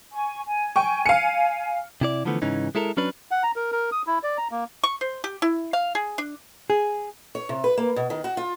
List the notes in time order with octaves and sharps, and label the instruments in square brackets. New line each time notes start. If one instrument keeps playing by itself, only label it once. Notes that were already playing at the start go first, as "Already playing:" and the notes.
[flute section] G#5 C#6
G#5
[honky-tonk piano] G5 C#6
F5 C#7
[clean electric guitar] C3 E4 D5
D3 E3 F3 A3 B3
G#2 C#3 E3 C#4 D#4
G#3 E4 A4 A#4
F#3 C#4 D4 B4
[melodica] F#5
A#5
A#4
A#4
D#6
E4
D5
A#5
A#3
[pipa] C#6
C5
G4
E4
F5
G#4
D4
[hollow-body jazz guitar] G#4
[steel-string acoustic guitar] C#5
C3
B4
A#3
B2
D#3
F#4
F4